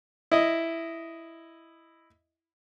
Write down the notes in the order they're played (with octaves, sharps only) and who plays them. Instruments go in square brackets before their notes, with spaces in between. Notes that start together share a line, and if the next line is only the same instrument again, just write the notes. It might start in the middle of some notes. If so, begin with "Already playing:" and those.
[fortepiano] E4 D#5